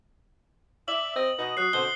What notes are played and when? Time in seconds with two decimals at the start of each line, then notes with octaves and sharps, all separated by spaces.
0.88 D5 E5 F#7
1.16 C4 D#5
1.38 B2 B3 D#5
1.57 F#3 D#6 F#6 C7
1.73 B2 D3 C5 G7